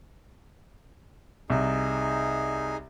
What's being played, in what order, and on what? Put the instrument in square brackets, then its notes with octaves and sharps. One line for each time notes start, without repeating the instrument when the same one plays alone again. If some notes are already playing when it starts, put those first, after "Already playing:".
[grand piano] C2 [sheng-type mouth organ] D#4 G#4